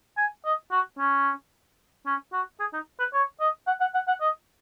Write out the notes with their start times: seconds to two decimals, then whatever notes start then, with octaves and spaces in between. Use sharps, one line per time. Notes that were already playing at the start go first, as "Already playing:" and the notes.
0.17 G#5
0.45 D#5
0.72 F#4
0.99 C#4
2.06 C#4
2.33 F#4
2.60 G#4
2.73 D#4
3.00 B4
3.14 C#5
3.40 D#5
3.67 F#5
3.81 F#5
3.95 F#5
4.08 F#5
4.21 D#5